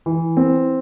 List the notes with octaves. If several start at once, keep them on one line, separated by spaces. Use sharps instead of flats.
E3
C4